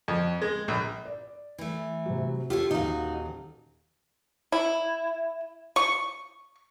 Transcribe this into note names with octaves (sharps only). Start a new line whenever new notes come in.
F2
G#3
A#1
D5
E3 A3
C3 F#3
F4 G4 A4 C#5
D#1 D#4 F#4 F5
E4
C#6